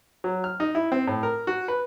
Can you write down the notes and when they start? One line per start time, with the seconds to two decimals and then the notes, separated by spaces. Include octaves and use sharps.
0.24 F#3
0.44 F6
0.60 D#4
0.75 E4
0.92 C4
1.07 A2
1.23 A#4
1.47 F#4
1.68 B4